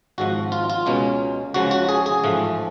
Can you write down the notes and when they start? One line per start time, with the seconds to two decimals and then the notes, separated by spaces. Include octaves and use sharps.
0.18 G#1 G#2 F3 F#4
0.52 F4
0.70 F4
0.86 C#2 B2 G#3 C#4
1.54 C#2 C#3 F3 F#4
1.71 F#4
1.89 G#4
2.06 G#4
2.24 A1 G#2 F3 A3